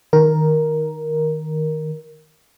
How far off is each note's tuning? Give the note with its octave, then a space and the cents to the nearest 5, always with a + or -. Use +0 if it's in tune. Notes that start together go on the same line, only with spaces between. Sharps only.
D#3 +0 A#4 +5